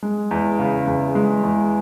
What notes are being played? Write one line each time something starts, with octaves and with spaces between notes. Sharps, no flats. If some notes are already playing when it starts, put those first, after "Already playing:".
G#3
E2
C#3
E2
G#3
E2